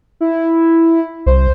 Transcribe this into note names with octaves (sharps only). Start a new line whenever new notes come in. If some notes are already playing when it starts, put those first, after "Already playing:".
E4
C2 C5